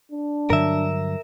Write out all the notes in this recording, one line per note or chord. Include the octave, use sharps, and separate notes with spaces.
D4
G2 D3 F#3 A#4 E5